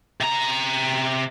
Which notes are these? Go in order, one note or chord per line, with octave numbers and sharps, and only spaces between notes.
C3 A#5